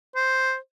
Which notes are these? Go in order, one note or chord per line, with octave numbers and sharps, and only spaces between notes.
C5